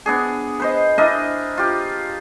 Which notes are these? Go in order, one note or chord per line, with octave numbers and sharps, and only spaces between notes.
B3 D4 G#4
B4 C5 D#5
D4 E4 A#4 D#5
F4 G4